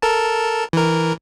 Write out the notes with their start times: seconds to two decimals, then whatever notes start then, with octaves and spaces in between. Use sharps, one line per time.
0.02 A4 A#4 A5
0.73 E3 A#4